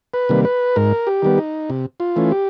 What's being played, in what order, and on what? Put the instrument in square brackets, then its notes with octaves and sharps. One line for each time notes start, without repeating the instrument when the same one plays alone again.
[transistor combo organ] B4
C3 D#3 G3 A#3
B4
G#2 A#4
G4
D#3 G3 B3
D#4
C3
F4
E3 A3 C#4
G4